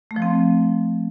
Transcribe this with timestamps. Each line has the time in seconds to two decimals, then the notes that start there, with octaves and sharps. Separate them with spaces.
0.11 A3
0.16 F3
0.22 C4